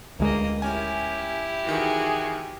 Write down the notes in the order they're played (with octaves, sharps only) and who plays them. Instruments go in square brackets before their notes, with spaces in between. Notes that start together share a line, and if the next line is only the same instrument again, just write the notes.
[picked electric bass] D2 G#3 [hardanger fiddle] A#3 D#5
[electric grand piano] C#4 A#4 G#5 [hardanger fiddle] E4 G4
[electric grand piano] D#3 E3 [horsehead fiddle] F#4 G#4